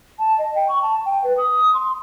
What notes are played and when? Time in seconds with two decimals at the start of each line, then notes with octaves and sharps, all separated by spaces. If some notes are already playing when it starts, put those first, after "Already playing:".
0.19 A5
0.38 D#5
0.55 G5
0.68 C#6
0.82 A5
1.06 G5
1.24 B4
1.37 D#6
1.74 C6